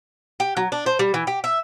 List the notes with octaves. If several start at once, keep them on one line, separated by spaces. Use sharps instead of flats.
G4
F#3
D4
C5
G3
E3
G4
E5